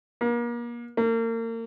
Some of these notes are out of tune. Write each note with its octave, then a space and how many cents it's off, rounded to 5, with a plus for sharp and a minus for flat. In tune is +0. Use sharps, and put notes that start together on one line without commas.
A#3 +35
A#3 -35